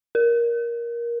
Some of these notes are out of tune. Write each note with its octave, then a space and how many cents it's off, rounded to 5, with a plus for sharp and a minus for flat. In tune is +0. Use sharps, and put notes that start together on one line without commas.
A#4 +15